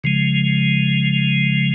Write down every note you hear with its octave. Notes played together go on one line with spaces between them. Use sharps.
C#3 F3 G#3